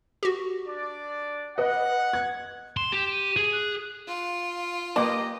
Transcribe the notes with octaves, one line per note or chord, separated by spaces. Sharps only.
F#4 G4
D4 D5
B4 D#5 F#5
G#6
C6 E7
G4
D#7
G#4
F#6
F4
A#3 G4 B4 D#5 A5 D6